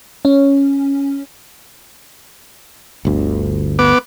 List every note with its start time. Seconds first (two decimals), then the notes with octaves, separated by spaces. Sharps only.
0.25 C#4
3.05 G1 D2
3.79 B3 D6